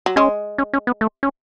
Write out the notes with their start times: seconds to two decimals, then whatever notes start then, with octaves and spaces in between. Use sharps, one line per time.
0.06 F#3
0.16 G#3 C#4
0.58 C#4
0.74 C#4
0.87 B3
1.01 A3
1.23 C#4